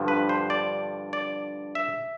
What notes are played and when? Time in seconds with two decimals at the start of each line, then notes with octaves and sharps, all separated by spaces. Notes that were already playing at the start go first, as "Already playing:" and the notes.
Already playing: G2 D3 F3
0.08 B4
0.29 C5
0.50 D5
1.13 D5
1.75 E5